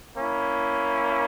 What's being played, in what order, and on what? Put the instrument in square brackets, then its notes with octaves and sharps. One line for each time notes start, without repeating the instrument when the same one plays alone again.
[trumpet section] A#3 C#4 E4